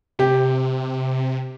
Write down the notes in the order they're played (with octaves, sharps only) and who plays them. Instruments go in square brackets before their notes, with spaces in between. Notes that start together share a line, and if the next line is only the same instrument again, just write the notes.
[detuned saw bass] C3 [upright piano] G4